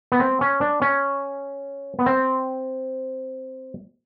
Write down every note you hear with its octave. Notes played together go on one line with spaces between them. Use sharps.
B3
C4
C#4
D4
C#4
B3
C4